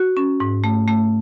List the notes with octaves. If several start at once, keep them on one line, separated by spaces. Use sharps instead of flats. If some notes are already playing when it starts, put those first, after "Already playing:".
Already playing: F#4
C#4
G#2
A3
A3